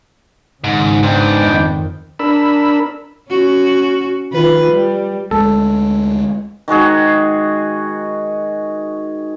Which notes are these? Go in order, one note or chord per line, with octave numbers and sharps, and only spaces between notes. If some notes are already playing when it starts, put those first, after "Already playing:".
G#1 G#2 C#3
G#2 B3 D4 G5
F2 D#3
D4 A#4 B5 E6
C#4 F#4
D#3 F4 B4
G3
D2 G#3 A4
D#3 G#3 F#4 G#4